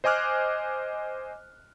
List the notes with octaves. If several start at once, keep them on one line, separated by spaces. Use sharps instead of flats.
C5 D#5 G#5 D6 F6 F#6